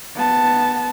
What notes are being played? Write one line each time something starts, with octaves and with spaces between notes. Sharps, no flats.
B3 A5